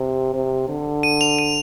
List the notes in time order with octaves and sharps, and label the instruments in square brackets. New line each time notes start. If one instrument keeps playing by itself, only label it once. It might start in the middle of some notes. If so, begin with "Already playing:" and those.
Already playing: [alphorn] C3
C3
D3
[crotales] D#7
F7
D#7